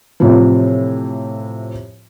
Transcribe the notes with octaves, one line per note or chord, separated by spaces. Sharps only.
A2 C3 E3 F3